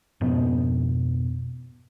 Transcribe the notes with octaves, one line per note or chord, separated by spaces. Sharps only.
F2 G#2 B2 B3